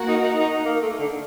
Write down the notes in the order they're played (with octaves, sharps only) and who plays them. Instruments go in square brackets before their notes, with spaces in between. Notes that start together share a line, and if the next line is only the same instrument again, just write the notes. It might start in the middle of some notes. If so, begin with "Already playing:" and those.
Already playing: [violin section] A#3 F#4 A#4 F#5
[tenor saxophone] D#4
D#4
D#4
A#3
A3
D3